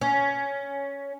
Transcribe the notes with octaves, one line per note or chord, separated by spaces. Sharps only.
C#4